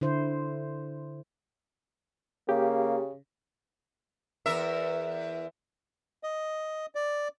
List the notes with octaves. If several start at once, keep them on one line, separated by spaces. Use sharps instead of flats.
D3 E4 C5
C#3 A#3 G4
E2 A#4 E5
D#5
D5